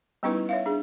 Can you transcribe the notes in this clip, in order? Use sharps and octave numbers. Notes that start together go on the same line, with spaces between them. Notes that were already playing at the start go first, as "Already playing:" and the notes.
G3 B3 C#4 D#4 E4 B4
C#5 E5 F5
D4 G#4